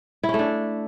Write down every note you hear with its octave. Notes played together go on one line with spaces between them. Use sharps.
E4
C#4
A3
D4